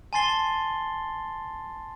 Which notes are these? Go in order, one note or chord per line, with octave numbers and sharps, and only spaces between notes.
G#5 A5 C6 A6 C7 G7